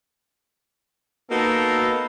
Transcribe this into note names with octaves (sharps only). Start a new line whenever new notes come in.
A#3 B3 D#4 F#4 A4